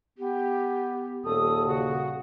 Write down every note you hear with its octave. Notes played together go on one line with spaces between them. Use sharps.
B3 G4
D#1 A4 D#6
C#3 F#4